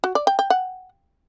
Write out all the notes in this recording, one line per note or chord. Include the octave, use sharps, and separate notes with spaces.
F#4
D5
G5
G5
F#5